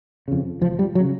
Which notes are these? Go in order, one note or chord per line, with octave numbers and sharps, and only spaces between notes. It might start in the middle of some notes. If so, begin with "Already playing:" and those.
F2 C#3
F1 F3
G3
F#3
C#3